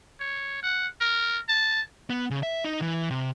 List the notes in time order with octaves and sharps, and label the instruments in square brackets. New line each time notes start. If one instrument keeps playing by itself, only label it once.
[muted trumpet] C#5
F#5
A#4
A5
[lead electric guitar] B3
C#3
E5
D#4
E3
C3